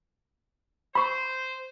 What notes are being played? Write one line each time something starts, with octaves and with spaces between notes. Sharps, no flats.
C5 B5 C#6